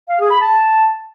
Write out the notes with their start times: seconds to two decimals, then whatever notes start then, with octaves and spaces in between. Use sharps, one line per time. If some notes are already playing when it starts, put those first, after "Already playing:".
0.09 F5
0.20 G#4
0.31 B5
0.42 A5